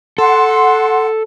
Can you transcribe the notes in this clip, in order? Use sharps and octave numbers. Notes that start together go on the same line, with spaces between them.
A4 F#5 C6